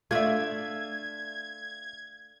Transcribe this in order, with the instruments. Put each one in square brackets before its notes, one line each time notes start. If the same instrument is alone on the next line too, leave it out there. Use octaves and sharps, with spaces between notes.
[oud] A3 D4 [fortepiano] F4 E5 [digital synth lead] G#6